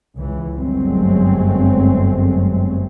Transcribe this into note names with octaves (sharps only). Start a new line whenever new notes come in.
C#2 E3
G1 F#2 F#3 G#3 A3 C4